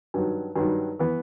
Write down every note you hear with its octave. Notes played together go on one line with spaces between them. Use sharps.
G2 D#3 F#3
G2 D#3 F#3
E3 B3